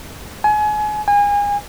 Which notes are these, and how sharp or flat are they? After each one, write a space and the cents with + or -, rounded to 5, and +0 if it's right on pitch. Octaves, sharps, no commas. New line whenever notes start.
G#5 +30
G#5 -30